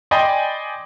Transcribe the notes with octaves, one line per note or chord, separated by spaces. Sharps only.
D5 D#5 G5 G#5 B5 C6